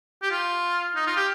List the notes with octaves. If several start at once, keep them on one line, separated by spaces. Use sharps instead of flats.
G4
F4
D#4
F4
G4